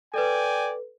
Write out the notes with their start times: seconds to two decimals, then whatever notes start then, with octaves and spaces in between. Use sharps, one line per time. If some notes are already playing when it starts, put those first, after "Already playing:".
0.14 A4 B4 D5 G5 G#5